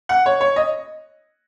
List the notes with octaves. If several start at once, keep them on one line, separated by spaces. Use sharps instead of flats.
F#5
C#5
C#5
D#5